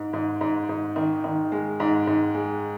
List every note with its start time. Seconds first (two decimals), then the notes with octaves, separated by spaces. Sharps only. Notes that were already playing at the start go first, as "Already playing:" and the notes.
Already playing: G#2
0.13 G#2
0.41 G#2
0.69 G#2
0.96 D#3
1.24 D#3
1.52 G#3
1.80 G#2
2.07 G#2
2.35 G#3